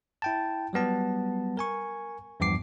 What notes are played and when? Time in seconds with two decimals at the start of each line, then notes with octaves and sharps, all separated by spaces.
0.22 E4 G5 A5
0.73 F#3 G3 B3 A5
1.57 A#4 G#5 C#6
2.40 E2 G2 F3 B3 D6 C7